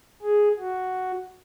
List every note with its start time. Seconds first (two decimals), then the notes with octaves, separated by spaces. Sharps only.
0.22 G#4
0.59 F#4